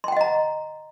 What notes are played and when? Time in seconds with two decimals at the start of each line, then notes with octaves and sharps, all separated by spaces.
0.04 C6
0.08 G5
0.12 F#5
0.17 D#5
0.21 A#5